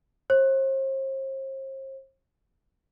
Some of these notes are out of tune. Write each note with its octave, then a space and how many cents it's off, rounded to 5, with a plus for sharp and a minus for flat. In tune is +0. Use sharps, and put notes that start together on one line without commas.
C5 +40